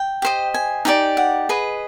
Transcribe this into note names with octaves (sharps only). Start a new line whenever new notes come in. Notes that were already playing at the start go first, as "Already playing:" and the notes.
Already playing: G5
G4 C5 D#5
G#5
D#4 G4 B4 D5
F#5
G#4 B4 D#5